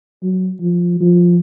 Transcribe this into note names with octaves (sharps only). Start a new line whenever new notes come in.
F#3
F3
F3